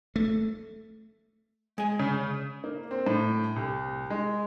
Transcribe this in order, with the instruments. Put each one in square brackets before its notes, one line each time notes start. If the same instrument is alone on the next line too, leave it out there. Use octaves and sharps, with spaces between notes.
[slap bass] A3
[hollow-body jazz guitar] G#3 G#5
[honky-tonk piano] C#3
[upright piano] A#3
C4
A2
C2
G#3